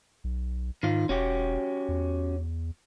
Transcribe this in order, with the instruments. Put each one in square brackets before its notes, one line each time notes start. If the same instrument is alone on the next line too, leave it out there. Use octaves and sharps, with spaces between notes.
[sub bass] B1
[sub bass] G#2 [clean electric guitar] D#3 F4
[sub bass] E1 [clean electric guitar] C#4 F#4 G4
[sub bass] E2